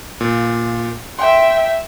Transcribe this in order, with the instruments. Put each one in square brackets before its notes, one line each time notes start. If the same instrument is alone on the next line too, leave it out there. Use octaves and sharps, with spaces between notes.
[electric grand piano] A#2
[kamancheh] E5 G5 [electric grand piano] C6